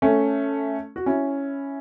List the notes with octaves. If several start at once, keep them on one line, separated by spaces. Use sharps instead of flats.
A3 C#4
F#4
C#4 E4